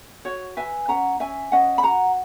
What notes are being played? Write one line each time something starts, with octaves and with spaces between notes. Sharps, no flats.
F#4 C#5
B4 E5 G#5
C#4 F#5 A#5
C#4 E5 G#5
C#4 D#5 F#5
B5
F#4 F#5 A#5